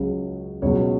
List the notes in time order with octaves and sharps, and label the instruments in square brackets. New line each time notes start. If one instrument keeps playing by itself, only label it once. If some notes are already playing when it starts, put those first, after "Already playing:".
Already playing: [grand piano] C#2 C#3 F#3
C#2 B2 F#3 C#5